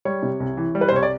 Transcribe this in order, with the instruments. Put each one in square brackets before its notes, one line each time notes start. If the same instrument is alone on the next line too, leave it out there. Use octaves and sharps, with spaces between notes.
[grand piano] G3 C#5
C3
C2
E3
G3
B4
C5
C2 C#5
D5